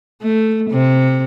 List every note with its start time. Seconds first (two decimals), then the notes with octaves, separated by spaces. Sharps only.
0.22 A3
0.70 C3